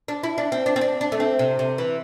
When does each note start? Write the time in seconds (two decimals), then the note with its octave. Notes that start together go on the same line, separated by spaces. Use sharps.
0.08 D4
0.23 E4
0.38 D4
0.52 C4
0.66 D4
0.76 C4
0.81 D4
1.01 D4
1.12 A3
1.20 C4
1.39 C3
1.59 C3
1.78 E3